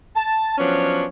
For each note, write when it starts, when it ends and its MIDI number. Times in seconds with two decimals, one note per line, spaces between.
0.15 0.55 81
0.58 1.05 53
0.58 1.05 54
0.58 1.05 59
0.58 1.05 61
0.58 1.05 62
0.58 1.05 73